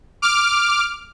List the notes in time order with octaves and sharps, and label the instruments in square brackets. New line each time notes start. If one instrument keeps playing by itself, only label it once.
[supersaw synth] D6 F6